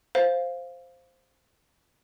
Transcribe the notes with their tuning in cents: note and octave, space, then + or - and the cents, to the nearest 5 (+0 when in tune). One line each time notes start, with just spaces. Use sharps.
C5 +0 F5 +0